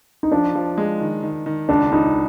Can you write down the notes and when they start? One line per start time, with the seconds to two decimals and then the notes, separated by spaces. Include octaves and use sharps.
0.23 D#4
0.32 F3 D4
0.55 F3
0.77 G#3
1.01 D#3
1.23 D#3
1.46 D#3
1.69 C#2 D4
1.92 C#2 D#4